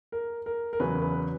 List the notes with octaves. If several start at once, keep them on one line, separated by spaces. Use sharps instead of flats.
A#4
A#4
A#4
E2 C#3 F#3 B4
B4